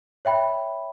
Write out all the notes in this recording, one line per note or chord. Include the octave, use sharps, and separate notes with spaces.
C#5 E5 G5 B5